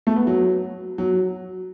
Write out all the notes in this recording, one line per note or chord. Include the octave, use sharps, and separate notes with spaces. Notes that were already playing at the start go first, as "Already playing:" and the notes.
A3
B3
F#3
F#3